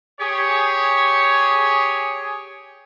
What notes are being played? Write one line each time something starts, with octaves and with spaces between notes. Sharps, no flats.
G4 G#4 C#5